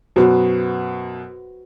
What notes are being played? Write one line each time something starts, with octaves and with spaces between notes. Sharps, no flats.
F#2 B2 F#3 F#4 B4 C5